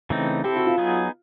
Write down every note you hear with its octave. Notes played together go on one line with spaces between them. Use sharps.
C#3 E3 A3 C4 D#4
C4 E4 G4 A4
F#4
F4
F#3 B3 D#4 G#4